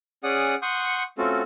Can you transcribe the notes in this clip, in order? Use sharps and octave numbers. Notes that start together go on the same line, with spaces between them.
C#4 G#4 D5 F#5 D#6
F#5 C6 C#6 D#6 G6
A3 C4 C#4 F4 F#4 A4